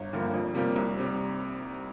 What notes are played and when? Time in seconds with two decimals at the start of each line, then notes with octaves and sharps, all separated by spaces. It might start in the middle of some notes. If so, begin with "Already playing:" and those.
Already playing: G1
0.13 G2 D3 F3 A#3
0.34 F2
0.54 C3 G3 A#3 G4
0.76 C2
0.97 C3 G3